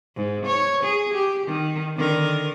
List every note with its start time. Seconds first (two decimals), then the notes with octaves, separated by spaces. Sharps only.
0.16 G#2
0.46 C#5
0.83 G#4
1.13 G4
1.46 D#3
1.96 D3 D#3 A#4